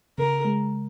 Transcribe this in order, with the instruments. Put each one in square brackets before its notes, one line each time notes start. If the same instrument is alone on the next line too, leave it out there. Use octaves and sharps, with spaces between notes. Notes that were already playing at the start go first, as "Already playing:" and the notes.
[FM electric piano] C#3 [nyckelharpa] A#4
[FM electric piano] G#3